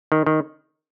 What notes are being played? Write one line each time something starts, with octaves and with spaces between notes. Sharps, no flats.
D#3
D#3